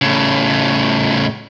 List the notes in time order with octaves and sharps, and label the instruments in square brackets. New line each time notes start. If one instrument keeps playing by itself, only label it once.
[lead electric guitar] A2 C#3